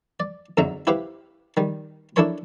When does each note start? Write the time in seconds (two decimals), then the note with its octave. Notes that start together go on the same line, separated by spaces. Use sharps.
0.20 D5
0.57 F2 G#2 D3 F#3 E5 A#5
0.87 E4 G4 B4 C5 F5
1.57 D#3 G3
2.16 D4 E4 A4 A#4 C#5 C6